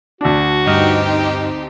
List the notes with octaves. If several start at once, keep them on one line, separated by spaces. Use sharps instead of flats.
D2 D4 F#4
G2 C4 D#4 G4 D#5 F6